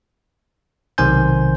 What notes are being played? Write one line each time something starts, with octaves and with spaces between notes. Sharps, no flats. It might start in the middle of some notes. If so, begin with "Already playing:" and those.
B1 C3 D#3 C5 G#5 G6